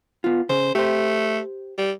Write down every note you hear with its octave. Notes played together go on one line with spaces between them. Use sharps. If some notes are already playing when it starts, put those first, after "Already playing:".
B3 F4
C#3 C5
A3 G4 C5
G3